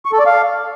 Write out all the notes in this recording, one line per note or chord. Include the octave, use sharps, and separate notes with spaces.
C#6
A4
D5
F5